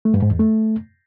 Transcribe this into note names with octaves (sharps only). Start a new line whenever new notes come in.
A3
G2
G#2
E2
A3